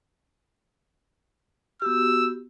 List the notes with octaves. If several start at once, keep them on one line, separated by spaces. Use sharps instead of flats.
B3 F#4 G4 E6